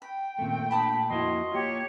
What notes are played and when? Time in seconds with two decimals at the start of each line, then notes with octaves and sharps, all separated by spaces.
0.02 G5 B5
0.39 F#2 A#2 D#3 A3 C4
0.71 D4 C5 A5 B5 D#6
1.10 F2 A#3 E4 F#4 D#5 C6
1.52 A#3 F4 G4 C#5